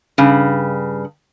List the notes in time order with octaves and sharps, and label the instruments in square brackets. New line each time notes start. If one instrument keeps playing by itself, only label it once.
[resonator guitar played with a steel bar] G2 C#3